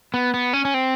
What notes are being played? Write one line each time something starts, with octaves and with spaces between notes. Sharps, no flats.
B3
B3
C#4
C#4
C4